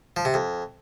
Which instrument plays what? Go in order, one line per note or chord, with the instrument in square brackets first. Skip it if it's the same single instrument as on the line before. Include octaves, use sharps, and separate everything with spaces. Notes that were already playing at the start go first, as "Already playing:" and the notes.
[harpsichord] F3
C3
F2